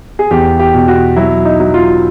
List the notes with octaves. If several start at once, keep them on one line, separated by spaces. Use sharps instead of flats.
G#4
E2 G4
G4
B2
F#4
F#3 E4
D#4
F#3
F4